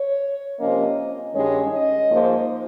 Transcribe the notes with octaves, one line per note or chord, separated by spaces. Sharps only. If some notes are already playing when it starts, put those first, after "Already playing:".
Already playing: C#5
C3 F3 A#3 C#4 D#5
G2 D#3 G#3 C#4 C#5
D#5
G#2 F3 A#3